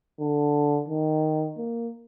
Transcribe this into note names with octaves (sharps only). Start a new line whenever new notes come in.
D3
D#3
A#3